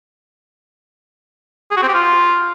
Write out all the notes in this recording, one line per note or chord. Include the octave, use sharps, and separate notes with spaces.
G#4
F#4
C4
G4
F4